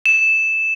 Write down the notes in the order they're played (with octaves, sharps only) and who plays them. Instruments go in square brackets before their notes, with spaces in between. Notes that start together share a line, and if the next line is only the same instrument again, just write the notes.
[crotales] E7